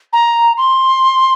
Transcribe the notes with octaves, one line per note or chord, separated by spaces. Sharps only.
A#5
C6